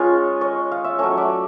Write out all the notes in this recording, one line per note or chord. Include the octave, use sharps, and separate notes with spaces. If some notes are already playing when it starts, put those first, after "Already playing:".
Already playing: G#3 C#4 F4 B4 C#5
C#5 D#5
F5
E5
F#3 A3 C#4 C#5 D#5
D5 E5